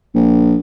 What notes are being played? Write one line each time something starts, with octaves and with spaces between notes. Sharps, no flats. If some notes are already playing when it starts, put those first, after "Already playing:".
A#1